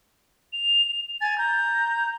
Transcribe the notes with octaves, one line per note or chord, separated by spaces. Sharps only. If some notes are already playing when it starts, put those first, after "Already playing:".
F7
G#5 A6
A#5 G6